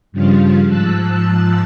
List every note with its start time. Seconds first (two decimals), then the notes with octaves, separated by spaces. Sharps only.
0.12 G2 C#3 F3 G3 F4
0.67 G#2 F3 A5 E6 F#6